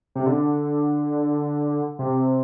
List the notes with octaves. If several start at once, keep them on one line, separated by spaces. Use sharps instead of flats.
C3
D3
C3